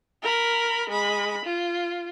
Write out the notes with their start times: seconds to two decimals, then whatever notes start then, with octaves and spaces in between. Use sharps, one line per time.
0.22 A#4 B5
0.89 G#3 B5
1.45 F4